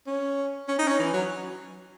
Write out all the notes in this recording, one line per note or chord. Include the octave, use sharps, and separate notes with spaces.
C#4
C#4
D#4
C#4
E3
F#3